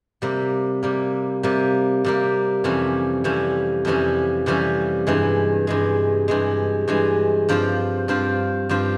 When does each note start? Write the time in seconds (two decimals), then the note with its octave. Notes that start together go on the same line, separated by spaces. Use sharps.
0.22 C3 G3 A#3
0.83 C3 G3 A#3
1.43 C3 G3 A#3
2.04 C3 G3 A#3
2.64 F2 C3 E3 G3 C#4
3.24 F2 C3 E3 G3 C#4
3.85 F2 C3 E3 G3 C#4
4.46 F2 C3 E3 G3 C#4
5.07 G2 E3 G#3
5.67 G2 E3 G#3
6.28 G2 E3 G#3
6.88 G2 E3 G#3
7.49 G2 F3 C4 F4 C5
8.08 G2 F3 C4 F4 C5
8.69 G2 F3 C4 F4 C5